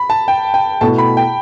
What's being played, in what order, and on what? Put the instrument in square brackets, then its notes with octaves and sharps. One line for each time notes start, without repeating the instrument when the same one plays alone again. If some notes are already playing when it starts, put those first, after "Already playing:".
Already playing: [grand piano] B5
A5
G5
G5
[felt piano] B2 A3 E4 [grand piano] A5
[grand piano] B5
G5